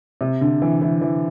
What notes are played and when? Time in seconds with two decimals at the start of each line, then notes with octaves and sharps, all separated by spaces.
0.21 C3
0.41 D3
0.62 E3
0.82 E3
1.01 E3